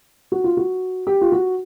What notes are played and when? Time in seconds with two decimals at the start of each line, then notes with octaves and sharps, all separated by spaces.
0.32 F#4
0.44 F4
0.57 F#4
1.07 G4
1.21 F4
1.32 F#4